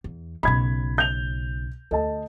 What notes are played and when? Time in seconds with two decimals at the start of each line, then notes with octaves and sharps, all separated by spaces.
0.04 E2
0.43 B1 C#3 B5 G#6
0.98 G6 F7
1.91 D2 A4 D#5 A5